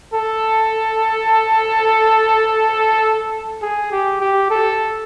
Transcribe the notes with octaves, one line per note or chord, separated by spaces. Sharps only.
A4
G#4
G4
G4
A4